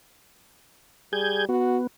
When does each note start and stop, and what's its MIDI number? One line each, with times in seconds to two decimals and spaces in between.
1.13 1.48 55
1.13 1.45 68
1.13 1.45 91
1.13 1.45 92
1.49 1.87 59
1.49 1.78 66